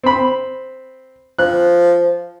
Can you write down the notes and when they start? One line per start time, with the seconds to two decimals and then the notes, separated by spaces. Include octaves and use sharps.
0.04 C4 B5
1.39 F3 F#6